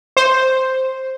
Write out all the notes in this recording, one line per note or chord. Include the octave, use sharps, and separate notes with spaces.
C5